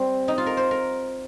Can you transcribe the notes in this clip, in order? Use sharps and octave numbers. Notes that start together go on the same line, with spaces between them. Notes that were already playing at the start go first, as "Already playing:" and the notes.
Already playing: G3 C4
D#4
F4
A#4
C5
A#4